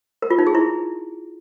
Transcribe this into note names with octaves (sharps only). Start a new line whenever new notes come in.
A#4
F4
D#4
G#4
E4